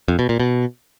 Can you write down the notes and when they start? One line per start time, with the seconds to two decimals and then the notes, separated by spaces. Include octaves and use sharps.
0.08 F2
0.19 B2
0.29 A#2
0.40 B2